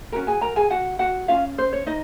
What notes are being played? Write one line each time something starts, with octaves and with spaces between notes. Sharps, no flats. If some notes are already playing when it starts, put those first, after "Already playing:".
C#4 F#4 A#4 A#5
G#4 G#5
A#4 A#5
G#4 G#5
F#4 F#5
F#4 F#5
C#4 F4 F5
C5
C#5
D#4 D#5